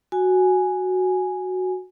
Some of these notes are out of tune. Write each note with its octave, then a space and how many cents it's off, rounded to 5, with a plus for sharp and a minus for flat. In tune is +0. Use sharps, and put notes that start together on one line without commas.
F#4 +0 G#5 +0